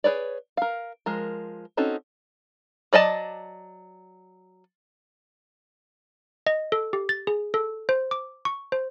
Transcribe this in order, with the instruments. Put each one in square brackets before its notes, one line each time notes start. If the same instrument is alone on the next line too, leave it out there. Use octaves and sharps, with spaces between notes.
[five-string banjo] G#4 B4 C#5 D5
A#4 F5
F3 G#3 A#4
C4 C#4 D#4 F#4 A4
F#3 D5 D#5 A5
[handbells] D#5
A4
G4
A6
G#4
A4
C5
D6
C#6
C5